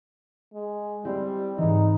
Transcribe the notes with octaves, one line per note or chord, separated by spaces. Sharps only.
G#3
G3 C4 E4 G6
G#2 E3 D#4